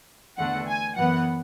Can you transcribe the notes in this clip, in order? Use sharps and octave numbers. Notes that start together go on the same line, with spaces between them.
E2 D3 A3 F#5
G#5
F#2 E3 B3 F#5